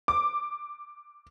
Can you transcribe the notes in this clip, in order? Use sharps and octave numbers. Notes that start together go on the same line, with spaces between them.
D6